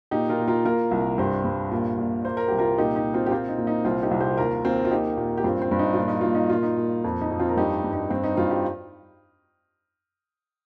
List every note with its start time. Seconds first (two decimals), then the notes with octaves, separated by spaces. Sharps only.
0.11 A#2 D#4 G4
0.29 F4 A#4
0.39 A#2
0.48 F4 A#4
0.65 A#3 F4 A#4
0.91 C2
1.18 G2 G4 C5
1.45 G2
1.71 A#2
1.98 A#2
2.25 A#3 C5
2.37 A#4
2.48 C2 G4
2.59 F4 A#4
2.78 A#2 D#4 G4
2.96 D#4
3.04 A#2
3.14 C4 F4
3.26 G4
3.31 A#3 C4 F4
3.49 D#4
3.58 A#2
3.67 D#4
3.84 C2 C4 F4
4.03 D#4 G4
4.11 C2
4.21 G4 C5
4.37 D#2 F4 A#4
4.64 D#2 C4 F4
4.85 F4
4.91 A#3 D#4 G4
5.17 A#2
5.37 G4
5.44 G2 C4 F4
5.62 C4
5.71 G2
5.79 D#4
5.94 A#2 F4
6.08 D#4
6.21 A#2 F4
6.35 D#4
6.50 A#2 F4
6.63 D#4
6.77 A#2
7.04 F2
7.21 D#4
7.31 F2
7.39 C4 F4
7.49 A#4
7.57 G2 D#4 G4
7.84 G2
7.93 D#4
8.10 G2 C4
8.24 D#4
8.37 G2 C4 F4
8.50 G4